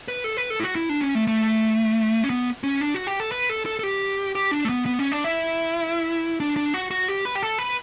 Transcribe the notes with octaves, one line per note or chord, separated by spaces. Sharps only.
B4
A4
B4
A4
E4
F#4
E4
D4
C#4
A3
A3
C#4
B3
C#4
D4
F#4
G4
A4
B4
A4
A4
A4
G4
G4
D4
A3
B3
B3
C#4
D4
E4
D4
D4
F#4
F#4
G4
B4
G4
A4
B4